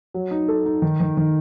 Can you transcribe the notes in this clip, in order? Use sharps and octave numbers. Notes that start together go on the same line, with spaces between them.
F#3
D#4
A4
D#4
D#3
D#3
D#3